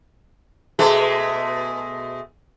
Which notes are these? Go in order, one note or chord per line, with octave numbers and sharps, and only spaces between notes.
B2 G#3 A3